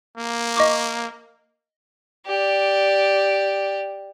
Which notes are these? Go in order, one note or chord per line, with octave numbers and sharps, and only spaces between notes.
A#3
D#5 C#6 D6
G4 D5